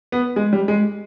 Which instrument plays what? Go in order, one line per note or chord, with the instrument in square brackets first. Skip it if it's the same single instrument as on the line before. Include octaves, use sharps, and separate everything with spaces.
[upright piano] B3
G#3
G3
G#3